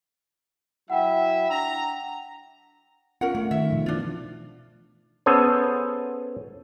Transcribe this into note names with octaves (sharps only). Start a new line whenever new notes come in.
F#3 E4 E5 F#5 G5
D4 A#5
C#4 F4 A#4 F#5
A3 C#4
D#3 E5
B2 F3
E3 D4 F4
B3 C#4 G#4 A4 C5